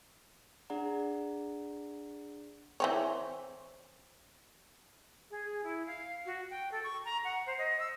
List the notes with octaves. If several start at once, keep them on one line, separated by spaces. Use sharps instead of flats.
D4 G#4 D5 F#5 A#5
E3 C4 C#5
G#4
E4
F5
F#4
G5
A4
C#6
A#5
F#5
C5
D#5
E6